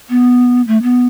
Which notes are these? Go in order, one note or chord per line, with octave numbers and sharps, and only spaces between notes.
B3
A3
B3